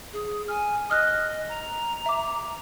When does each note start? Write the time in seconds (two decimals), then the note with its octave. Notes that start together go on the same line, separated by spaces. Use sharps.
0.13 G#4
0.48 G#5 F6
0.90 D#5 D#6 F6 F#6
1.49 A#5
2.06 E5 D6